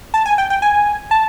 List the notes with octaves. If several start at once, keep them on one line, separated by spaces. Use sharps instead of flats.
A5
G#5
G5
G5
G#5
A5